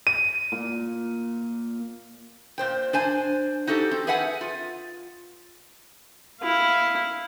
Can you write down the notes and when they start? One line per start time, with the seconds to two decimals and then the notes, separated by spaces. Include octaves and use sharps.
0.07 D#7
0.52 A#2
2.58 A#2 C5 G5
2.93 D4 C5 G#5
3.67 D#4 F#4 G4 A4
3.91 C4
4.07 G#4 B4 E5 F#5 G#5
4.41 F4
6.42 E4 F5